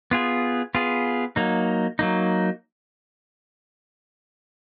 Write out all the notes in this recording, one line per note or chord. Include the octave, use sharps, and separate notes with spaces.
B3 F4 G#4
B3 F4 G#4
F#3 A#3 D#4
F#3 A#3 D#4